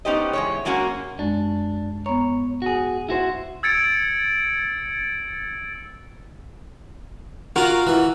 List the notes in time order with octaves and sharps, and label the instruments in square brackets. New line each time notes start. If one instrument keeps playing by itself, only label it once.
[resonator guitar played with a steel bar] B3 C#4 D#4 G4 C5 D#5
E2 G#3 C#5
F#3 G#3 A#3 C#4 F#4
[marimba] F#2 G#3 [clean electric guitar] D4
[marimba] B3 A#5 [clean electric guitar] C#5
[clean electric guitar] F#4 G#4
E4 F#4 C5
[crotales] E6 G#6 A6 C#7 D7
[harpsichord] F4 [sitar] F#4 A#4
[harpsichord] E3